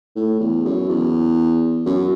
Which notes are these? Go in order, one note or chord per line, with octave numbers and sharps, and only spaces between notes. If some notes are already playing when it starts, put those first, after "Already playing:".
A2
E2
F#2
E2
F#2